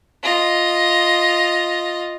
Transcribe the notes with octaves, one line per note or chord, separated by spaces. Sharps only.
F4 D#5